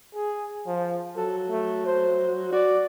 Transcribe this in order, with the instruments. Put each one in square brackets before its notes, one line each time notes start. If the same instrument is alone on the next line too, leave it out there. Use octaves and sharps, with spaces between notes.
[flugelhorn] G#4
F3
[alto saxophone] F#3 [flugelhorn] A4
[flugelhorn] A3
C5
[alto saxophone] F#4 [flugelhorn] D5